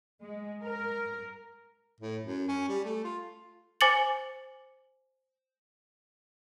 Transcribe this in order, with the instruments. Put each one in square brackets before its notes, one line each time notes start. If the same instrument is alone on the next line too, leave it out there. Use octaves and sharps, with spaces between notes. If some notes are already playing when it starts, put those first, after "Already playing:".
[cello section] G#3
A#4
[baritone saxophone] A2
F#2
C#4
G3
A3
F4
[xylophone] C5 G#5 D6 A6 C#7 F#7